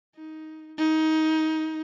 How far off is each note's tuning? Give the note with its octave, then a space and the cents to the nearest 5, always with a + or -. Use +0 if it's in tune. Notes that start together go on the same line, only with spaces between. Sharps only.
D#4 +15
D#4 +20